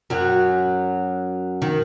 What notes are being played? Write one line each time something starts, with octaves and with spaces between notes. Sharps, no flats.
F#2 F#3
D#3